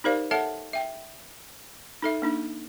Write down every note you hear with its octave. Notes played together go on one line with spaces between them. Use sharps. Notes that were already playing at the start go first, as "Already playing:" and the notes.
D#4 G4 A#4 C5 D5 F5
A4 C#5 E5 F#5 A5
E5 G5
D#4 A4 E5
A#3 D4 D#4